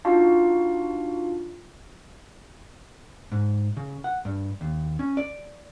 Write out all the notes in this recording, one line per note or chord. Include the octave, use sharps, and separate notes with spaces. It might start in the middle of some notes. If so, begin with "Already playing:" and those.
D4 D#4 F4 F#4 F5 A5
G#2
C#3
F#5
G2
D#2
C#4
D5